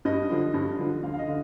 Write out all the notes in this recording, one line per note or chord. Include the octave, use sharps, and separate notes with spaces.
G2 D#5
D3 F3
G2
D3 F3
D2 F5
F5
D#5
D3